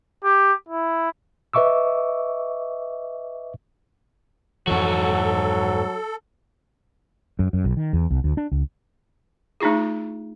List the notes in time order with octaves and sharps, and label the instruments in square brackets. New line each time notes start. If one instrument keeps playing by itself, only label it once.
[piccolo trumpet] G4
E4
[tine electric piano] B4 D#5 E5 C#6 D6 E6
[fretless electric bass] F2 E3 [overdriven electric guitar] G#2 F#4 [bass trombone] F#3 [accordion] A4
[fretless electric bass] F#2
F#2
B1
D#3
E2
C2
D2
D4
C#2
[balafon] A3 D4 D#4 F4 G#4